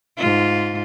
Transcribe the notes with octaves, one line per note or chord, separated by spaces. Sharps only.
G#2 F4